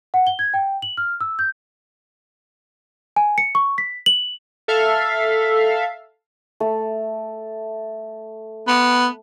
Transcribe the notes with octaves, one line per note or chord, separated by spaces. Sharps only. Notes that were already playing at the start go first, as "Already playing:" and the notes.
F#5
G7
G#6
G5
F#7
F6
E6
G6
G#5
C#7
C#6
B6
F#7
A4 E5 F5
A3
B3